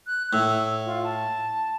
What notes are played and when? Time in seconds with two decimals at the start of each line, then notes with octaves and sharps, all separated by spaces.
0.07 F#6
0.33 A2 E6
0.86 F4
1.04 A5